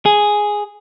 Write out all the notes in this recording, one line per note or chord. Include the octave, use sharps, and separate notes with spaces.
G#4